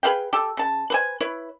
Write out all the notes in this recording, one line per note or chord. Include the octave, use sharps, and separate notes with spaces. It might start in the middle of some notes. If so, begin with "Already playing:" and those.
G#4 B4 F5 G5
G4 A4
C#3 A5
B4 C5 G#5
E4 B4 C#5